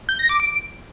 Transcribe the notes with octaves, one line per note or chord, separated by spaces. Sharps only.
G6
A#6
D6
D7